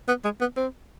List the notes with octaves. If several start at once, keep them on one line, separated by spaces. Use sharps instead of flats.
B3
G#3
B3
C4